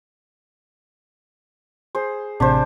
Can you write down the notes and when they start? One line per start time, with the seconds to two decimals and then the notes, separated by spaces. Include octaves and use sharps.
1.95 G#4 C5
2.40 A1 C3 D4 C5